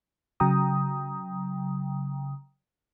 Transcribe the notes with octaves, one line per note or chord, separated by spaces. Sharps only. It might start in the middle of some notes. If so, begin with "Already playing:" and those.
C#3 F#3 G5 A#5 D#6